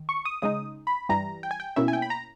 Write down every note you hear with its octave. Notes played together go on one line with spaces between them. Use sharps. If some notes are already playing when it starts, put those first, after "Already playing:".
Already playing: D#3
C#6
D#6
C#3 G#3 D#4 D#6
B5
G2 E3 G3 A#5
G5
G#5
G5
B2 A#3 C#4 E4 E5
G#5
G5
B5
A#5